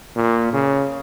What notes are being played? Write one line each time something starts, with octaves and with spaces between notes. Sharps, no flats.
A#2
C#3